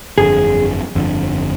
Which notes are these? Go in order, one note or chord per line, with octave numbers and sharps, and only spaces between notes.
G1 F2 D3 G#4
G1 F2 D3